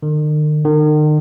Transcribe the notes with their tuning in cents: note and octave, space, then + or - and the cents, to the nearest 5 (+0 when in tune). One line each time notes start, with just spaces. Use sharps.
D#3 -45
D#3 -40